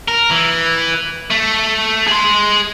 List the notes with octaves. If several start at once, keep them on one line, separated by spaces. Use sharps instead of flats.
A#4
E3
A3
G#4 C6